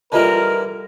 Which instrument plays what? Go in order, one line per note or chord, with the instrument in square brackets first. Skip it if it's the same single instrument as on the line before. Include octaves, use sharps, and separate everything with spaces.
[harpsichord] D3 E3 G3 [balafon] F4 D#5 A5 [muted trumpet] A#4